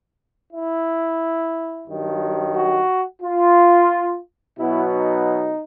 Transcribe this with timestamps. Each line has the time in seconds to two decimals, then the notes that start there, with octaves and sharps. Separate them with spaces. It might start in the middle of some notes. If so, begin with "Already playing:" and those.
0.52 E4
1.87 G2 D#3 F#3
2.55 F#4
3.22 F4
4.57 B2 F#3 B3 E4
4.91 D#4